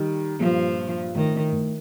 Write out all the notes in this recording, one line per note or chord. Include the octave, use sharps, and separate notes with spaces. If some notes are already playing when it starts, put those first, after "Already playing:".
Already playing: D#3 G3
G2 A#2 F3
A2 D#3
A2